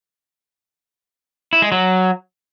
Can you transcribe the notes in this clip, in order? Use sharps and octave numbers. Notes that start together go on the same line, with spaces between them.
E4
G#3
F#3